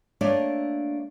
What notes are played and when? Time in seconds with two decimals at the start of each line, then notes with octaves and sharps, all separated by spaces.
0.21 A3 A#3 D4 C#5 D5